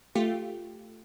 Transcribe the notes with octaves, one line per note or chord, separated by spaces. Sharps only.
A3 F4 G4